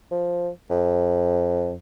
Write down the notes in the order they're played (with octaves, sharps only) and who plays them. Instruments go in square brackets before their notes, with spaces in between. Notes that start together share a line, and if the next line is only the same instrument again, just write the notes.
[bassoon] F3
F2